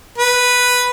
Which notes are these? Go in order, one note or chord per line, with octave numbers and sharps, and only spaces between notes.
B4